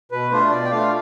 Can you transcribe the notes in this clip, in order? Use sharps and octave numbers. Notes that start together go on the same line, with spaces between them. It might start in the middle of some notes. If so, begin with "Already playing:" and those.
B2 B4
A3 D4 F4 C5
B2 D5
G5
A3 D4 F4 F5